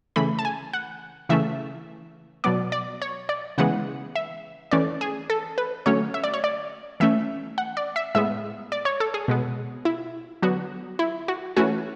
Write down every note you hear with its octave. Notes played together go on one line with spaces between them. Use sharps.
C#3 E3 A3 B5
A5
G#5
F#5
C#3 E3 A3 C#4 E5
B2 F#3 B3 D5
D5
C#5
D5
C#3 E3 G#3 B3 F#5
E5
E3 A3 C#4 D5
G#4
A4
B4
D3 F#3 A3 C#4 C#5
E5
D5
C#5
D5
E3 A3 C#4 E5
F#5
D5
E5
A2 G#3 B3 E5
D5
C#5
A4
G#4
B2 G#3 B3
E4
D3 F#3 B3 F#4
E4
F#4
E3 A3 C#4 F#4